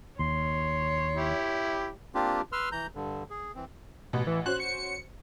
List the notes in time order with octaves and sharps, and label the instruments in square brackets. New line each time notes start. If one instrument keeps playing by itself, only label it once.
[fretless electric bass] D#2 [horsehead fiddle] C#5 [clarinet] C6
[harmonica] E4 G4
[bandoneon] A#3 C4 D4 F4 G4
B4 C6 E6 F6
E3 A#5 G6
G2 D3
G#4
E3 C4
[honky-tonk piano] A1 [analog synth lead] B2
[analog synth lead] E3
[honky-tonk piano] C#4 F#4 C5 [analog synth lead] F#6
[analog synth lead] C#7